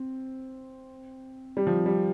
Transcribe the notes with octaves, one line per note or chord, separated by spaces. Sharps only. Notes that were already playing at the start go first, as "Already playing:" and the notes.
Already playing: C4
G3
F3
G3